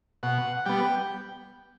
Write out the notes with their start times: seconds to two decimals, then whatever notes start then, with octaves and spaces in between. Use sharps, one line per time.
0.23 B2 F#5
0.66 G3 B3 G5